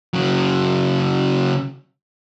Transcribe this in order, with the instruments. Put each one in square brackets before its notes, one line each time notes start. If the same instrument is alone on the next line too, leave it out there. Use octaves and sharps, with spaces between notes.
[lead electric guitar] C#3 F#3